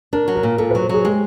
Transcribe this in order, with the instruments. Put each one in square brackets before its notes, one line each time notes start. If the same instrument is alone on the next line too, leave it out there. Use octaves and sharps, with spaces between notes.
[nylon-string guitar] D4 [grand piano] A#4
[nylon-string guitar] F#3
[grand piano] A#4
[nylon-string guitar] A#2
[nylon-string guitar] A#2 [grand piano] A4
[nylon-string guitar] F#3 [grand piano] B4
[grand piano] C5
[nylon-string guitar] F#3 [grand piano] G#4
[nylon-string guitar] G#3 [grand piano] G4